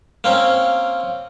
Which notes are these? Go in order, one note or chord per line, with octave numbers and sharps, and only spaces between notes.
A#3 C4 C#4